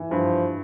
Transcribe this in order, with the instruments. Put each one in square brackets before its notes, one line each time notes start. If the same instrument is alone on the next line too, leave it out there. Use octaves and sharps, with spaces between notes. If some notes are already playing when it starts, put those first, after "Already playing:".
Already playing: [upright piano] E3
[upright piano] G2 [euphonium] F3